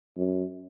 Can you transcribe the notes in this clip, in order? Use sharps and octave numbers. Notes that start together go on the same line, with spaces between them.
F#2